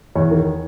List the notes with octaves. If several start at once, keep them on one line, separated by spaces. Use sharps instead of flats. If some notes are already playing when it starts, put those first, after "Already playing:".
E2 C#5
D#3